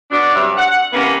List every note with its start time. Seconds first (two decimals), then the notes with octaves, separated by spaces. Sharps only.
0.11 B2 D4
0.34 G2 C3 F#3 D5 E5
0.57 F#5
0.93 C3 E3 A#3 B3 C#4